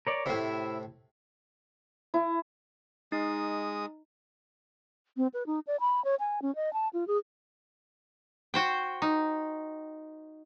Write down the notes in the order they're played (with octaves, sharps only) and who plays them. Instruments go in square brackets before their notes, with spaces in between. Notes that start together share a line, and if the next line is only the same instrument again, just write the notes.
[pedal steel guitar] A#4 C#5 D5
[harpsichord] A2 C3 [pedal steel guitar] E4 E5
[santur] E4
[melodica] G#3 D#6 [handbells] D#4
[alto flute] C4
B4
D#4
D5
B5
C#5
G#5
C#4
D#5
A5
F4
G#4
[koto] F#4 C5 G5
D#4